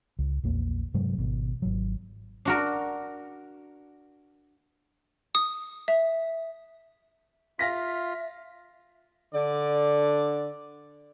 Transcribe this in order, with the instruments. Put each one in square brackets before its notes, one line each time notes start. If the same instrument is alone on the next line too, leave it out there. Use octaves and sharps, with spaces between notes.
[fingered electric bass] C#2
A#1 E2 A#3
G2 C3 F#3 G#3
G#1 B2
G#1 F#3
[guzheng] D4 F#4 A#4
[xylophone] D#6
E5
[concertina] F4 [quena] E5 [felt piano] F5 A#6 B6
[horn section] D3 D5